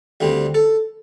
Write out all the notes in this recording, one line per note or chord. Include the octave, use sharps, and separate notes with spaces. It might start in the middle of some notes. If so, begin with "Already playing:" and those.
D2 D3 G3 C4
A4